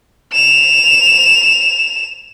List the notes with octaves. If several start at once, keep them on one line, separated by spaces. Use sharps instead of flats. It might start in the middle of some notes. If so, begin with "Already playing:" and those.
E7 F7